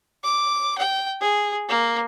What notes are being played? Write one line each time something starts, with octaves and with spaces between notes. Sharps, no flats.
D6
G5
G#4
A#3